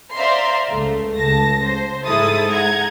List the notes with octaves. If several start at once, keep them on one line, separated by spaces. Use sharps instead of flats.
C5 D5 E5 F5 A#5 C6
C#2 A3
C#2 A5 A#6
C5
G#2 G#3 E4 A4 D#6 A6
F#5 A#5 G#6